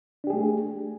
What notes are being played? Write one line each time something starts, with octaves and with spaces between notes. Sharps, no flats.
A3 D4 G4 G#4